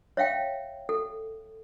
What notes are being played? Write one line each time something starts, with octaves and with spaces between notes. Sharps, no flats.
C#5 E5 F5 G5
A4